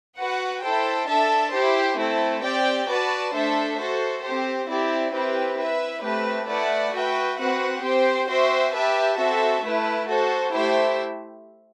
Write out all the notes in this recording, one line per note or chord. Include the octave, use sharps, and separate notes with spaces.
F#4 B4 F#5
E4 A4 C5 G5
D4 A4 E5 A5
E4 G4 C5
A3 C4 E4 A4
C4 G4 D5 G5
F#4 B4 D5 A5
A3 D4 A4 C5 E5
F#4 A4 C5
C4 G4 C5
C4 E4 G4 D5
C4 E4 G4 B4
E4 B4 E5
A3 C4 G4 B4
A3 E4 B4 D5 F#5
F#4 B4 E5 G5
C4 F#4 B4 F#5
C4 G4 C5 G5
F#4 C5 E5 G5
G4 B4 E5 A5
C4 F#4 A4 E5
A3 E4 B4
F#4 A4 C5
A3 E4 G4 C5 E5